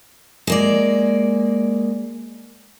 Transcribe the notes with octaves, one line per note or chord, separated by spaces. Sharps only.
G#3 A#3 D5